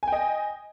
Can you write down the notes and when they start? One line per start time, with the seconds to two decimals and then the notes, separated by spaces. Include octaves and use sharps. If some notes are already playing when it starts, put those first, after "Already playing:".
0.03 G#5
0.08 G5
0.12 D#5